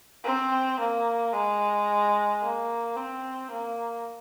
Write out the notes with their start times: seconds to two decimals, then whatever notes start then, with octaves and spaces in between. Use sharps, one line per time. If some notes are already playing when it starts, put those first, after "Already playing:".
0.24 C4
0.79 A#3
1.33 G#3
2.42 A#3
2.97 C4
3.51 A#3